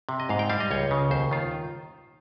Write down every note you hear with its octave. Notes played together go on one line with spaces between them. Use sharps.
C3
D#5
G#2 F5
G5
G3 F5
D#5
C#2 C#5
C#3
D#2 C5
D#3 F4